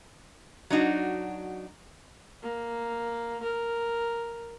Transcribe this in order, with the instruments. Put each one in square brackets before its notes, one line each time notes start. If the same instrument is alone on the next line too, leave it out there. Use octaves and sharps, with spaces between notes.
[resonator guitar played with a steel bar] F#3 D4 D#4 F#4
[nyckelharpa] A#3
A#4